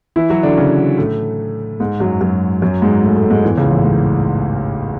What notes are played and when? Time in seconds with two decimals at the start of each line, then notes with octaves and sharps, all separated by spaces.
0.16 E3 E4
0.30 F#3 F#4
0.43 D3 D4
0.57 C#3 C#4
0.98 A2 A3
1.80 G#2 G#3
2.00 F#2 F#3
2.21 F#2 F#3
2.62 F#2 F#3
2.82 G#2 G#3
3.03 A2 A3
3.16 A2 A3
3.30 G#2 G#3
3.44 E2 E3
3.57 C#2 C#3
3.71 A1 A2
3.85 G#2